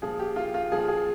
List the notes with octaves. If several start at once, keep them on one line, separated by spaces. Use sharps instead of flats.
A#2 F3 G#4
G4
F4
F4
A#2 F3 G#4
G#4